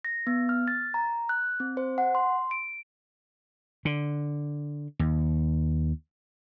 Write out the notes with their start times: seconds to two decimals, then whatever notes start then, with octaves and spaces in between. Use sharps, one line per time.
0.05 A#6
0.27 B3
0.49 F6
0.68 A6
0.94 A#5
1.29 F#6
1.60 C4
1.77 C5
1.98 F#5
2.15 C6
2.51 D7
3.85 D3
4.99 D#2